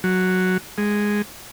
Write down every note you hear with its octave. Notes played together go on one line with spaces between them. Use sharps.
F#3
G#3